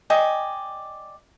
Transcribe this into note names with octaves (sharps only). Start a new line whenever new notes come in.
D5 D#5 G5 G#5